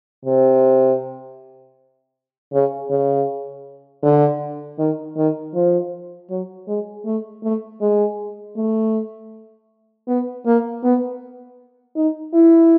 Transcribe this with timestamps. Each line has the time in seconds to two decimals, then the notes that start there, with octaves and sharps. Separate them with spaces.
0.25 C3
2.53 C#3
2.90 C#3
4.03 D3
4.79 D#3
5.17 D#3
5.55 F3
6.30 F#3
6.68 G#3
7.06 A3
7.43 A3
7.81 G#3
8.56 A3
10.08 B3
10.46 A#3
10.84 B3
11.96 D#4
12.34 E4